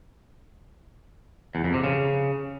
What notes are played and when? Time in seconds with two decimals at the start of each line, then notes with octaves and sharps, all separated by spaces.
1.55 E2
1.64 F2
1.74 C3
1.84 C#3